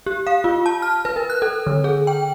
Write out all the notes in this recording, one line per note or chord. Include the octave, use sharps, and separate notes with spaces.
G4
F5
F4
A5
F6
B4
A#4
F#6
A4
D3
G#4
G5